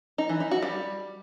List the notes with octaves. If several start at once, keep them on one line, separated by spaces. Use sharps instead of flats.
D#4
E3
D#4
F#4
G3